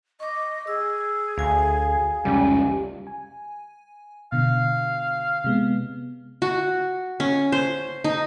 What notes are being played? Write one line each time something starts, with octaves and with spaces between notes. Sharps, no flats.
D#5 C#6 D6
G#4 E6
D2 F5 G#5
F1 C#2 G3 C#4
G#5
B2 D3 F5
C3 G#3 B3
F#4
C#4
C5
D#4